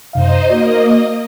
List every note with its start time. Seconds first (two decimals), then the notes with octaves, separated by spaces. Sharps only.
0.13 F#2 C3 D#4 C5 D#5 F5
0.48 A#3 F#4 D5 D#5